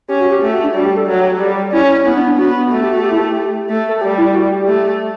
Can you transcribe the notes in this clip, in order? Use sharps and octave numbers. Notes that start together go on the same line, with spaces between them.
C#4 G4
F#4
G4
A3 G4
F#4
D4
G3 F#4
G4
A4
F#3 A4
G4
A4
G3 G4
C#4 E4
B3 E4
D4
D4
B3 F#4
A3 F#4
G4
F#4
G4
E4
A4
G4
A3
A4
G3 G4
E4
F#4
G4
A3